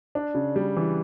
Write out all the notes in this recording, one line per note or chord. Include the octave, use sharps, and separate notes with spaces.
D4
C#3
G3
E3